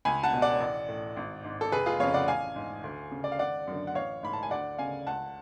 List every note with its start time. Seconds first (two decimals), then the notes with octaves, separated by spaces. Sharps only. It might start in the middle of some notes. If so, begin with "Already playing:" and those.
0.05 C#2 G#5 B5
0.23 F#5 A5
0.33 B2
0.42 D5 F#5
0.60 A1
0.89 A2
1.17 G#1
1.44 G#2
1.61 A4
1.72 F1 G#4 B4
1.86 F4 G#4
2.00 F2 C#3 C#5 F5
2.14 D5 F#5
2.28 A1 F5 G#5
2.56 G#2
2.84 D2
3.12 C#3
3.24 D5
3.32 F5
3.39 G#1 D5 F#5
3.67 F#2 D3
3.87 F#5
3.95 A1 C#5 F5
4.23 G#2 B5
4.33 A5
4.43 G#5
4.51 D2 D5 F#5
4.78 C#3 F5 G#5
5.06 C#2 F#5 A5